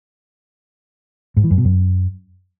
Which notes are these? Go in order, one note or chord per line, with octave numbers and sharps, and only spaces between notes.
G#2
E3
F#2
B2
F#2